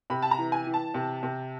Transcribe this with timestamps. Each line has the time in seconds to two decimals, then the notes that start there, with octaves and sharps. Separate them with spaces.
0.10 C3 B5
0.22 A5
0.31 A#5
0.38 E3
0.52 G#5
0.67 E3
0.74 A5
0.94 C3
1.23 C3